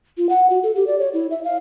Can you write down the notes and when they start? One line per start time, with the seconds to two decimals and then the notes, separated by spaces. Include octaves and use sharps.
0.18 F4
0.29 F#5
0.50 F#4
0.63 A4
0.75 G4
0.87 D5
0.99 C#5
1.14 E4
1.31 E5
1.44 F5